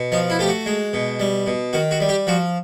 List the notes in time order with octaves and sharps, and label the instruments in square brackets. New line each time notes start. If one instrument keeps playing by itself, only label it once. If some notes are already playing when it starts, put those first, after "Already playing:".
Already playing: [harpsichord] B2
F3 D#4
E4
A3 G4
F#4
G#3
B2
G3
B2
D#3 F#4
F#4
G3
G4
F3 F#4